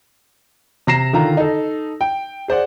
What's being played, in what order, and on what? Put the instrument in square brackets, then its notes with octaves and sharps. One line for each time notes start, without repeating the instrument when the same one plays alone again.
[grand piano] C3 A#5 A#6 C7 E7
D3 D#3 F4 A#5
D#4 A4
G5
G#4 C5 D5 F#5